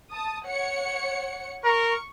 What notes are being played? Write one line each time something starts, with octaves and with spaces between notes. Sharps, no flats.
A5 D#6
C#5 F#5 C#7
A#4 C#6